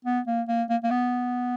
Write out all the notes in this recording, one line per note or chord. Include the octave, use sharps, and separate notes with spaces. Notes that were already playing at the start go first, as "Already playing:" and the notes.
B3
A#3
A#3
A#3
A#3
B3